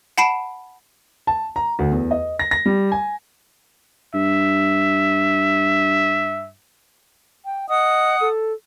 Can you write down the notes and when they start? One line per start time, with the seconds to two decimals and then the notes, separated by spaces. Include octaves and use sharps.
0.18 F#5 A5 B5 C7 D7 E7
1.27 A5
1.56 A#5
1.79 D2
1.92 E2
2.11 D#5
2.39 A#6
2.51 A#6
2.66 G3
2.92 G#5
4.14 G2 E5
7.45 G5
7.69 D#5 F#5 D#6
8.21 A4